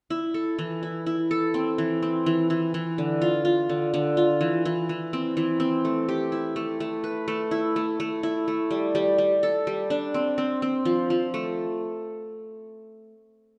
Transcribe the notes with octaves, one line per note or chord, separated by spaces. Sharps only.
E4
A4
E3
E4
E4
A4
C4
E3
C4
E3
E3
E3
D3
F4
F4
D3
D3
F4
E3
E3
E3
C4
E3
C4
A3
G4
E4
A3
A3
B4
A3
E4
A3
A3
E4
A3
G3
G3
G3
A4
G3
D4
C4
C4
C4
F3
F3
A3